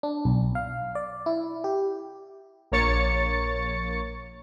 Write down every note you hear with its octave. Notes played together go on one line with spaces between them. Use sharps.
D4
B1
F5
D5
E4
G4
A#1 A#3 C#5 A6 C#7